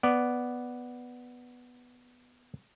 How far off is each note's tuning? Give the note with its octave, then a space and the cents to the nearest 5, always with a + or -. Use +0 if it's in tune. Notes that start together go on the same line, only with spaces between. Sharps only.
B3 +0 D5 +0